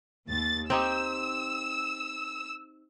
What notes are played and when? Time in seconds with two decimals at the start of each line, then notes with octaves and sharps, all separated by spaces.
0.28 D#2 A6
0.70 C4 D#4 G4 E6